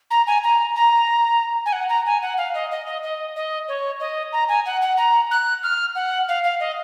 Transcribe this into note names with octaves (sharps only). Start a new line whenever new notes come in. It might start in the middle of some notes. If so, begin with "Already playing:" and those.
A#5
G#5
A#5
A#5
G#5
F#5
A#5
G#5
F#5
F5
D#5
D#5
D#5
D#5
D#5
C#5
D#5
A#5
G#5
F#5
F#5
A#5
F#6
F6
F#5
F5
F5
D#5